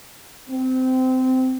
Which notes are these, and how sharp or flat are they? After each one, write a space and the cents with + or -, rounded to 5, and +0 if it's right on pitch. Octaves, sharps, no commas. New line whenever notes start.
C4 -20